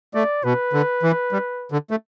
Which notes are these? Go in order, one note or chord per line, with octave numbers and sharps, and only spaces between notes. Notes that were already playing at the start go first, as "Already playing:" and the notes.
A3 D5
B2 B4
D3
E3
G3
D3
A3